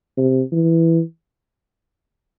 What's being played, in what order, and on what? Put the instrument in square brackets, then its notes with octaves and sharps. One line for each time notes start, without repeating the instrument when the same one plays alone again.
[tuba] C3
E3